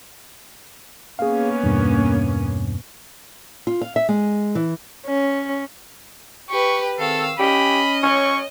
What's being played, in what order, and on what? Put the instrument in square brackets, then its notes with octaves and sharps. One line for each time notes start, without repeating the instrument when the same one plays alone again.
[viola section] A#3 B3 C#4 [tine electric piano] G#4 F5
[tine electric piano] E2 G2 B2
[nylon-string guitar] F4
F5
E5
G#3
E3
[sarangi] C#4
[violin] G4 B4 [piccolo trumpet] C#6
[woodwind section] G#2 D#3 C4 [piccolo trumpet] A4 [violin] F5 E6
[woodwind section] C#4 [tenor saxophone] G4 [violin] D#5 [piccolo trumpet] B5
[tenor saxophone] C#4 [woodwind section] C#5 [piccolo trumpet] C#6